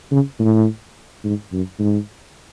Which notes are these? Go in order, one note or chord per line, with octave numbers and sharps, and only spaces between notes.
C#3
A2
G#2
F#2
G#2